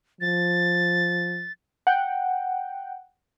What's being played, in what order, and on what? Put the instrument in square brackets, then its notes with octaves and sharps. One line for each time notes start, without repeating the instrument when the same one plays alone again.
[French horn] F3 [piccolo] A6
[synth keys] F#5 G5